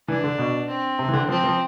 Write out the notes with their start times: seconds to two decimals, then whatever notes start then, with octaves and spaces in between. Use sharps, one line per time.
0.08 E3 D4
0.24 D3
0.38 B2
0.69 C4
0.99 C3
1.08 E3
1.13 D3
1.29 F3 C4
1.44 F3